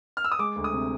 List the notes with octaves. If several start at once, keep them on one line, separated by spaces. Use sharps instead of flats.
F6
E6
D#6
G#3 D6
D2
D#6
C3